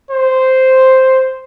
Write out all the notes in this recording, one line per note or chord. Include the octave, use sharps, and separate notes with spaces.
C5